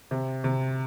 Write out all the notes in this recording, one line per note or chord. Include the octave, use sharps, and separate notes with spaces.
C3
C3